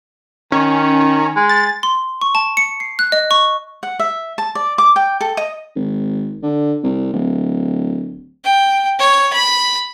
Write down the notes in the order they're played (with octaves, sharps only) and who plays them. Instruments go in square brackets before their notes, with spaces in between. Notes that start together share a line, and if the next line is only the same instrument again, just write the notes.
[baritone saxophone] D#3 [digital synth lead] C#4
[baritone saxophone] G#3
[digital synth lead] A6
[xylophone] C6
C#6
A5
C#7
C7
F#6
D#5
C#6
[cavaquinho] F#5
E5
A5
D5
D6
G5
A4
D#5
[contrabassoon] G#1
D3
C2
D1
[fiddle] G5
C#5
B5